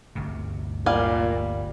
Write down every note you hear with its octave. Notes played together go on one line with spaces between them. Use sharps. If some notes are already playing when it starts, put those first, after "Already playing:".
G1 D2 C3
A#2 G3 F5 G#5